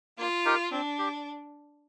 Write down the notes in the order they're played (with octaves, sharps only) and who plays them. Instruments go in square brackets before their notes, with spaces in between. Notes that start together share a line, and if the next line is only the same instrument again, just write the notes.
[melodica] A#3 [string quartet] F4
[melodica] D#4 G4 A#4
[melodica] C4 [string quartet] D4
[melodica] G4